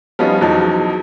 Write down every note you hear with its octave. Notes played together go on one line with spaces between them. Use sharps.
F3 G3 B3 C#4 D#4 F4
E1 E2 F3 F#3 D#4